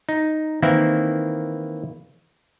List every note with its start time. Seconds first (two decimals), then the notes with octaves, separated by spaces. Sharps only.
0.09 D#4
0.62 D#3 E3 A#3 C4 E4